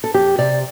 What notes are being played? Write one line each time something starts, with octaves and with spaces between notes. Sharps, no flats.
A4
F2 G4
C3 D5